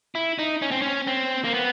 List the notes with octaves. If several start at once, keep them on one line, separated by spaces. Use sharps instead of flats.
E4
D#4
C#4
C4
C#4
C4
A#3
B3